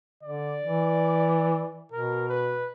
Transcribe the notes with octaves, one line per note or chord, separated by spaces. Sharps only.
D3 D5
E3
B2 A#4
B4